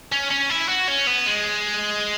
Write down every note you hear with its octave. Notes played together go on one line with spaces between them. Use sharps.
C#4
C#4
E4
F#4
C#4
B3
G#3